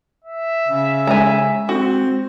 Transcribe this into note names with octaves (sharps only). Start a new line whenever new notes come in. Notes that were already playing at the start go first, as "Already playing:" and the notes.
E5
C#3
G#3 G#5 A#5
C4 F#4